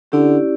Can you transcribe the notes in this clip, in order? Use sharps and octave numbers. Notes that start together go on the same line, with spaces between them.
D3 C#4 E4 G4 D5